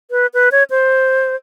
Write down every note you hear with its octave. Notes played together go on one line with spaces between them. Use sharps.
B4
B4
C#5
C5